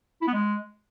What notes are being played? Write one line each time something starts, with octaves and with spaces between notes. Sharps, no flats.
E4
B3
G#3